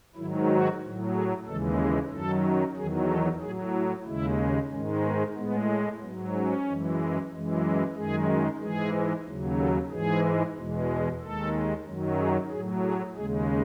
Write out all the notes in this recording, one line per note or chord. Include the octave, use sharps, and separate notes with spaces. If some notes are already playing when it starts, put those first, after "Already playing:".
G#2 D#3 F#3 E4
F#4
A2 F#3
G#4
D#2 C#3 E3 G#3 A4
G#4
F#2 D#3 F#3 A4
E2 D#3 F#3 G#4
A4
A2 F#3 G#4
E4
D#2 C#3 G#3 E4
G#2 D#3 G#3 C#4
B3
A2 G#3 B3
G#2 F#3 B3
C#4
F#2 E3 G#3
F#2 E3 G#3
F#2 D#3 G#3 G#4
G#2 E3 G#3 G#4
D#2 C#3 F#3
A4
G#2 E3 G#3 G#4
E2 B2 G#3
G#4
D#2 D#3 G#3 A4
F#2 D#3 F#3
G#4
A2 F#3 G#4
G#4
D#2 C#3 G#3 G#4